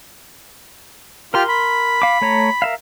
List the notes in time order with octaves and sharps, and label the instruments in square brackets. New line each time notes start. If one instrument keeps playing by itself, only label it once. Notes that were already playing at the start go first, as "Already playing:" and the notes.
[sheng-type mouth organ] F4 G4 F6 [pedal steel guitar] A#4 C6
[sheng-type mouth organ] B5
[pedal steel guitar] F5 D6
A3 C#5 A#5
A#4 E5 F5